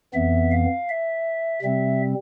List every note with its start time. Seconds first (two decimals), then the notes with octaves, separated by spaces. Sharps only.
0.14 F2 E3 B3 E5
0.52 F5
0.89 E5
1.62 C3 G3 C4 E5